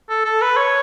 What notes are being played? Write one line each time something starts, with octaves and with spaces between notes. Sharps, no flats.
A4
A4
B4
C#5